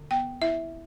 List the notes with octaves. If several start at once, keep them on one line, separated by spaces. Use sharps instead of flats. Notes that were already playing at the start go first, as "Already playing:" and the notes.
Already playing: D3
B3 G5
E4 E5